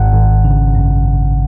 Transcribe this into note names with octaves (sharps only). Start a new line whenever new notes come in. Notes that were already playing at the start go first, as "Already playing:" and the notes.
Already playing: G#1 G#2 F#5
G#1
C#3
F#2